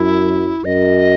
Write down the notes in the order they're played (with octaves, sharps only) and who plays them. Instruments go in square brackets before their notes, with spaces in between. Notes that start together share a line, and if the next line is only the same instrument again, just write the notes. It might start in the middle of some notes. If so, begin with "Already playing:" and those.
Already playing: [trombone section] F#2 [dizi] E4
[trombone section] F#2 [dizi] D#5